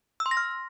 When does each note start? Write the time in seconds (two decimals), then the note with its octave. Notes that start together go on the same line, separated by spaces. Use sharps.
0.20 E6
0.26 C6
0.31 A#6
0.37 F6